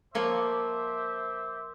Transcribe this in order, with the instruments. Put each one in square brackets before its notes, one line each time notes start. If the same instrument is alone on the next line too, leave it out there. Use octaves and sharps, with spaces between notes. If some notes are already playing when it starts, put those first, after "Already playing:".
[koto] F3 A#3 C#5 [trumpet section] C5 E5 D6